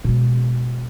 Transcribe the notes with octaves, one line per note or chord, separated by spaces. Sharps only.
B2 G#3